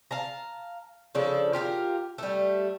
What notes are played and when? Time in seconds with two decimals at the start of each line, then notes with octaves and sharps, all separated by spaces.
0.11 F5 A5 A#5
1.15 C#3 F3 D4 A4
1.53 F4 G4 G#4 A#4
2.18 G3 A3